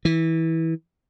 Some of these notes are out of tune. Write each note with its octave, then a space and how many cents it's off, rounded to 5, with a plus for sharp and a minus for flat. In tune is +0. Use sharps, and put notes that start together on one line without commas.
E3 -20